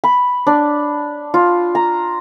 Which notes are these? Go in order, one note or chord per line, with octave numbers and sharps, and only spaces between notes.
B5
D4
F4
A#5